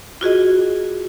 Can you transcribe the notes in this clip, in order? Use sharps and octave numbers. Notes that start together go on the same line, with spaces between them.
F4 F#4 G#4 D#5